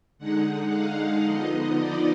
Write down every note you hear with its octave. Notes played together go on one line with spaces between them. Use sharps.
D3 G#3 D#4 F#5
F5
D3 F3 B3 D#4 D#5
D5